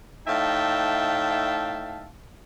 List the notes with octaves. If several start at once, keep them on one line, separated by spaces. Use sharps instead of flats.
A2 D#4 E5 F5 G5 A5